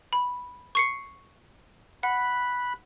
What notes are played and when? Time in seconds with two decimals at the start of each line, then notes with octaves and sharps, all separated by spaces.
0.13 B5
0.75 C#6 C7 C#7
2.03 F#5 B5 F#6